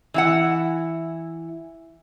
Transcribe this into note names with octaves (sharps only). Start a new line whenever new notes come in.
E3 E4 F#5